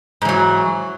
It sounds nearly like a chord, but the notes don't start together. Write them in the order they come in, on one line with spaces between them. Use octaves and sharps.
G#2 E3 F#3